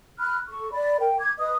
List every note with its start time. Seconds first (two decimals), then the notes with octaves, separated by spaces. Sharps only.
0.19 B5 F6 F#6
0.48 A4 C#6
0.71 D5 B5
0.99 A#4 G5
1.19 D6 G#6
1.39 B4 D#5 D#6